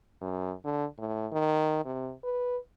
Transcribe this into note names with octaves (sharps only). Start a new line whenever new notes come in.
F#2
D3
A2
D#3
C3
B4